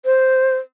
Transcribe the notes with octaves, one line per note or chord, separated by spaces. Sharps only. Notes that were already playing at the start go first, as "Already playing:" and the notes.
C5